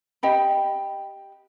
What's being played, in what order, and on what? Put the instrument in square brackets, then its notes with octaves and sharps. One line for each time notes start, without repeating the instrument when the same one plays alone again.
[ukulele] G4 D#5 G5 B5